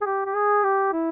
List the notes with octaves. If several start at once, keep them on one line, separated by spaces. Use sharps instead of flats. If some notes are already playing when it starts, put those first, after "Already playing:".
G#4
G4
G4
G#4
G4
E4